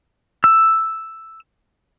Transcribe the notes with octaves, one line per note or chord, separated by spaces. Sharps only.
E6